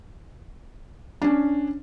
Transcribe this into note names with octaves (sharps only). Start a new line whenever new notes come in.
C#4 D4